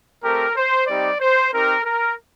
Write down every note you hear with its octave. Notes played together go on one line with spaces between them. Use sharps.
A3 C4 G4 A#4
C5
G3 C4 D#4 G4 D5
C5
C4 D#4 G4 A#4
A#4